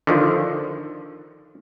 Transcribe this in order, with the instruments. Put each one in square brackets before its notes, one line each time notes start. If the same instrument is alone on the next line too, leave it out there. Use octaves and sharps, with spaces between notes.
[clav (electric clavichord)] D3 D#3 F3